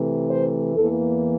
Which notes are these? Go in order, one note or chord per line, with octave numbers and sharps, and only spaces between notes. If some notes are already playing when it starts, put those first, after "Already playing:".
Already playing: C3 E3 A3
C5
E2 E3 A#3 A4